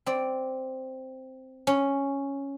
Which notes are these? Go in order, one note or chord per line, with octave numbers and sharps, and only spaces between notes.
C4 D5
C#4